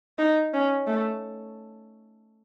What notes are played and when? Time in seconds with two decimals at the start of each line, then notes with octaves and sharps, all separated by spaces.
0.18 D#4
0.54 C#4
0.87 A3